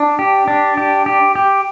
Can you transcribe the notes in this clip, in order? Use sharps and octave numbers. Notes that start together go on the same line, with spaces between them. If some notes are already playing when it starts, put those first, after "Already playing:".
Already playing: D4
G4
D4
G4
G4
G4